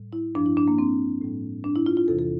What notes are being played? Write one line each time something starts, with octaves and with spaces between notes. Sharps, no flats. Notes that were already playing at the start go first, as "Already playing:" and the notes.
Already playing: A2 G3
E4
G2 F3 D4
E4
D4
A#3
C4
A2 G3
D4
E4
F4
F4
E2 C3 E3 A4
A4